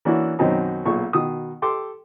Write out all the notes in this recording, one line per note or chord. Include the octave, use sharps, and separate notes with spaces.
E3 A#3 C#4 D4 E4 F#4
F#2 B2 D#3 C4 C#4 D#4
B1 A#2 G#4 C#6
B2 D#3 D#6
G4 A4 C6 D6